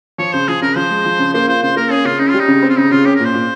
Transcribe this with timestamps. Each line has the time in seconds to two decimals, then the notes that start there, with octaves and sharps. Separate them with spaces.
0.18 F3 C#5
0.33 C#3 C5
0.48 F3 G#4
0.62 C#3 A#4
0.76 F3 C5
0.90 G#3
1.05 F3
1.19 C#3
1.33 A#3 C5
1.48 F4 C5
1.63 C#3 C5
1.76 A#3 A#4
1.90 C#4 G#4
2.05 C#3 F4
2.19 C#4 D#4
2.29 F4
2.34 G3
2.39 D#4
2.48 C#3
2.62 C4
2.69 F4
2.77 C#3 D#4
2.91 C#3 F4
3.05 C#4 G4
3.15 A#4
3.20 A#2
3.25 C5
3.34 A#2